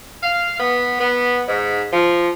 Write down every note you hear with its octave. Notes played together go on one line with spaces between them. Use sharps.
F5
B3
B3
G#2
F3